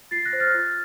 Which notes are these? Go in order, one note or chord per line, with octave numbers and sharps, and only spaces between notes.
F4 A6 C7
F#6 A#6
C5
F6 A6
F4